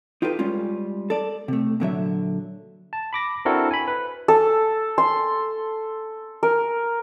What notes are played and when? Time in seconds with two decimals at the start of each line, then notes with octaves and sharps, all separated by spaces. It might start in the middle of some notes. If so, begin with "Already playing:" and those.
0.22 D#4 F4 G4 A4 B4
0.39 G3 G#3 C#4 F4
1.10 A4 D5
1.48 C3 A3
1.80 A#2 D3 F#3 E5
2.93 A5
3.13 B5 D6 A#6
3.45 C4 D4 E4 F#4 A4 A#4
3.71 G#5 B5
3.88 B4
4.28 A4
4.98 C6
6.43 A#4